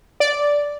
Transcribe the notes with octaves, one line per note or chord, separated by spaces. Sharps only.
D5